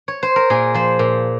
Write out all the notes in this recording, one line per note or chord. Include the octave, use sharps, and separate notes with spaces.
C#5
C5
A#4
A#2 G#4
F3 C5
A#2